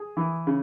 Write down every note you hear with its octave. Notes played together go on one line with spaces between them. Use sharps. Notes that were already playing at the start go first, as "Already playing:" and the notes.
Already playing: G#4
E3
C#3